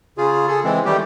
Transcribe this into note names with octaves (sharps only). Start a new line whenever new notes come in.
C#3 F4 G#4
G#4 A4
E3 G#3 C4
D#3 G3 A3 G4